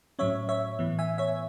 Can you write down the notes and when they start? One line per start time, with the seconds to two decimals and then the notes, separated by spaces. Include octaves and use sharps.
0.19 A2 F#3 C#4 C#5 E5
0.49 C#5 E5
0.79 A2 E3 B3
0.99 E5 G#5
1.18 C#5 E5